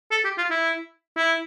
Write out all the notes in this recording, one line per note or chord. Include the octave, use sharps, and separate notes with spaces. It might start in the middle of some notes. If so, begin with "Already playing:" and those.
A4
G4
F4
E4
E4